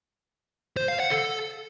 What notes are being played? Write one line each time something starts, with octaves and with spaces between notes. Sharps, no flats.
C5
F5
F#5
A4